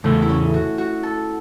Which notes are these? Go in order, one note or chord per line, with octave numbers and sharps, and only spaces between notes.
E2 C#3 A3 A4
E4
C#4
F#4
F#4
A4